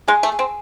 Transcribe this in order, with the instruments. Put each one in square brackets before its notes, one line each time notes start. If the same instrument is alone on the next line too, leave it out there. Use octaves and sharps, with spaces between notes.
[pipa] G#3 [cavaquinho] G#4
[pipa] A3
[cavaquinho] G#4
[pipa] C4